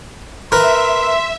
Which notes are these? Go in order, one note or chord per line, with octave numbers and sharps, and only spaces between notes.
A#4 B4 E5 C6